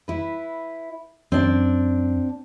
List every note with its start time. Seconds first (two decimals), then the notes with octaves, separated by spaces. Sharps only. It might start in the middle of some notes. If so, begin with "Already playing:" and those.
0.08 E4 B4
1.32 F#2 C4 D4 D5